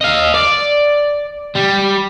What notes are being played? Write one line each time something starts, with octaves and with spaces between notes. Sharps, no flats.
D#5 F5
D5
G3